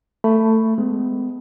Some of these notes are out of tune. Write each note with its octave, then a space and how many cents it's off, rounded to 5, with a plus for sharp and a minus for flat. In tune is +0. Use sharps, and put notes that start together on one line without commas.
A3 +15 B5 +0
G#3 +0 B3 +40